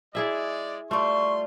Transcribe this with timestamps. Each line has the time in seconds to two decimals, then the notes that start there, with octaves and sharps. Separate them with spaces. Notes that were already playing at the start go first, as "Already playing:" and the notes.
0.15 G#3 E4 G#4 D5 E5
0.91 G3 A3 F4 C6 C#6